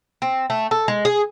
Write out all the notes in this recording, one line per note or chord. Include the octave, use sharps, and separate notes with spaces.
C4
A3
A4
G#3
G#4